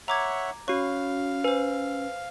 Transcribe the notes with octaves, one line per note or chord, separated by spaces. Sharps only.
C#5 E5 F#5 A#5 D6 G#6
C#4 F#4 C#5 F5 C#6
B4 C5 G#5